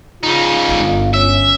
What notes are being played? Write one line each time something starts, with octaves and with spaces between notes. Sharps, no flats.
C#3 D#4 F4
G1
C#4 E5